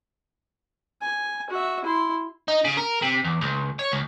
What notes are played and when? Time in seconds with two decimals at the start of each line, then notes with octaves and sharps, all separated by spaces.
1.02 G#5
1.50 F#4 E5
1.85 E4 C6
2.48 D#4
2.65 C#3
2.77 A#4
3.02 C3
3.24 E2
3.42 C#2
3.79 C#5
3.92 C#2